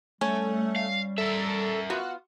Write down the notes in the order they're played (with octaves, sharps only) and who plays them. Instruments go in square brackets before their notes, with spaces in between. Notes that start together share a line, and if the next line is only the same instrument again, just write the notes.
[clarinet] G3 [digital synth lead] A3 [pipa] C#4
[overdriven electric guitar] F5
[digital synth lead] A4 [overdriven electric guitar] A#4 E5
[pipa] B3 F4 [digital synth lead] F#4